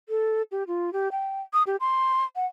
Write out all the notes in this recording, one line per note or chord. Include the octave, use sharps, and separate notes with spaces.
A4
G4
F4
G4
G5
D#6
G4
C6
F#5